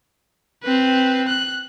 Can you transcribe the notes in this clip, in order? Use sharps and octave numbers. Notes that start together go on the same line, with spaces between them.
C4 B4
F#6